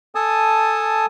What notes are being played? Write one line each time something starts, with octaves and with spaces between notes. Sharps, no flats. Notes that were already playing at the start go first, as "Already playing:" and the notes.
A4 G#5 A5 D#6